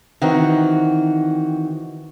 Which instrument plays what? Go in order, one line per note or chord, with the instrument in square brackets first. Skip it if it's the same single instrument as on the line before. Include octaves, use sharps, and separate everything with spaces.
[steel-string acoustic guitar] D#3 E3 C4 F#4